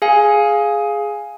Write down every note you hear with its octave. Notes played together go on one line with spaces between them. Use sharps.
G#4 F5 G#5